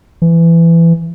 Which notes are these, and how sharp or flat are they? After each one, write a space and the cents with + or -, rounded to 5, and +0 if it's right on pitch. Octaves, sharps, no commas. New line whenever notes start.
E3 +20